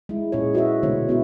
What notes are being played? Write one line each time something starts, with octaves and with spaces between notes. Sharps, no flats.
G#3 E4
A#2 C#4 G#4 C#5
E4 F#4 B4 D#5 E5
B2 D3 G#3 A3 C5 C#5
B3 E4 F#4